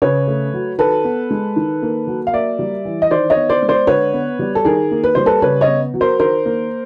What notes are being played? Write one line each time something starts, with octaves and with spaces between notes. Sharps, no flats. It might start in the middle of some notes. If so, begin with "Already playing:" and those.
C#3 B4 C#5
A3
F#3
D#3 A4 B4
B3
G#3
D#3
A#3
F#3
F5
A#3 D5 E5
G3
E3
D#5
D#3 C5 D5
C#5 D#5
B3
C5 D5
G#3
C5 D5
D3 B4 C#5
B3
G3
A4
D#3 G#4 A#4
A#3
B4
G3 C5
A4 B4
C#3 B4 C#5
C#5 D#5
B3
F#3
A#4 C5
D#3 A#4 C5
A#3